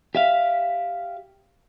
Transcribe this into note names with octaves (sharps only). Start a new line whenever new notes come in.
G4 E5 F5